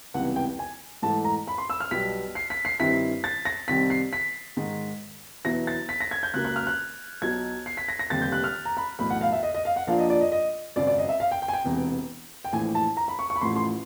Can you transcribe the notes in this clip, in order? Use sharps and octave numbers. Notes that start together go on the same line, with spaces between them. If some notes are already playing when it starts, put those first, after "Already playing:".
C#2 C3 E3 G3 B3 F#5
G5
G#5
G#2 E3 A3 A5
A#5
B5
C6
E6
F6
B1 B2 G3 B3 B6
C7
B6
C7
G2 D#3 G3 C4 E4 B6
A6
A#6
C2 C3 D#3 G3 C4 B6
C7
B6
G#2 D#3 G#3
E2 B2 F#3 B3 E4 A#6
A6
B6
A#6
G#6
G6
C#2 C#3 F#3 A#3 F#6
F#6
F6
F#6
B1 B2 F#3 G#6
C7
B6
A#6
A#6
F1 D#2 D3 G3 C4 A6
G6
F#6
F6
A#5
B5
B1 A2 E3 B5
F#5
F5
E5
D#5
D#5
F5
F#5
A#1 A#2 F3 A#3 D4 F5
D#5
D5
D#5
D#5
G#1 F#2 C#3 D5
D5
D#5
E5
F5
G5
G5
G#5
G5
E1 E2 C3
G5
A#1 A2 E3 G#5
A5
A#5
B5
C#6
C#6
B5
A1 A2 F3 C6
C6